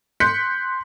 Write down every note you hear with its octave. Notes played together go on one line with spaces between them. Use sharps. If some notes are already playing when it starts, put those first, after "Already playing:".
C6 F#6 G6 B6 C#7